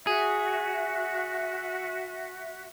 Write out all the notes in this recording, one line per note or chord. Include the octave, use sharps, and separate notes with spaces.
F#4 G#4 E5